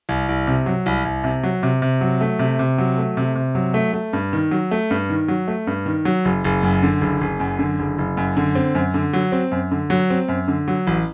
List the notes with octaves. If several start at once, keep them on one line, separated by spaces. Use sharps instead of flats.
C2
C2
C3
F#3
C2
C2
C3
F#3
C3
C3
F#3
A3
C3
C3
F#3
A3
C3
C3
F#3
A3
A3
G2
D#3
F#3
A3
G2
D#3
F#3
A3
G2
D#3
F#3
F#1
F#1
F#2
D3
F#1
F#1
F#2
D3
F#1
F#1
F#2
D3
C4
F#2
D3
F#3
C4
F#2
D3
F#3
C4
F#2
D3
F#3
A1